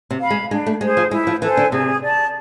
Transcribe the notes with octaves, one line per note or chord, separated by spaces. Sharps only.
C3
F5 B5
G#3
G#3 D4
A3
G#3 G#4 C5
F3
G#3 E4
F3
E3 A4 C5 G#5
D3
C3 G#4
D5 A5